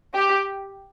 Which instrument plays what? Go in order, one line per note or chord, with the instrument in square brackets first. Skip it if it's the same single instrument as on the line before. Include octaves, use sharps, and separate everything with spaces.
[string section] G4